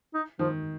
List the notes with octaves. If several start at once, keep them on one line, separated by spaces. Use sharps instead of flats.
D#4
D#3 F3